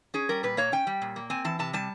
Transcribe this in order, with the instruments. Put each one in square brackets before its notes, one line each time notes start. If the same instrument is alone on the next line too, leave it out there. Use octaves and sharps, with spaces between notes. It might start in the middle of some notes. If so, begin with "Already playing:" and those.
[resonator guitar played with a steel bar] C#4 G#4
G3 A#4
A#2 B4
A#3 C#5
C#4 G5
G3
A#2
A#3
C4 G#5
E3 A5
C3 A5
G3 A5